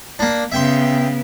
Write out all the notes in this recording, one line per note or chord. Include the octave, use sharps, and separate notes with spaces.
A#3 D4
C#3 B3 E5 G5 C6